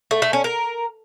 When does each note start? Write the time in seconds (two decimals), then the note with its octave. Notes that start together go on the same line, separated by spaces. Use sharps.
0.11 A3
0.22 A3
0.33 C#4
0.44 A#4